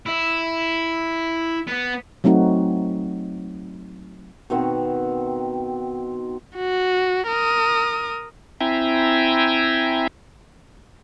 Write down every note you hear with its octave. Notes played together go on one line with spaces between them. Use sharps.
E4
B3
F#3 A3 C4 D#4 F#4
B2 D#3 C4 F#5
F#4
A#4 D#6
C4 E4 E5 G5 G#5 A#5